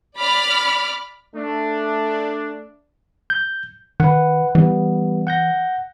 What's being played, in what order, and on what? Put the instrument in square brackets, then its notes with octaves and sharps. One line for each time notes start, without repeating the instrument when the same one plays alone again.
[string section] D5 B5 D6 F6
[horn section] A3 D4
[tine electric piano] G6
[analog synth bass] D#3 [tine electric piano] B4 F#5
[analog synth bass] E3 [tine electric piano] G3 B3
[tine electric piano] F#5 G6 A#6